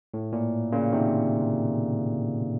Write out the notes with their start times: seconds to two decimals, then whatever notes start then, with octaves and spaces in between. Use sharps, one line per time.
0.14 A2
0.32 A#2
0.72 A#2 C#3
0.92 C3 D#3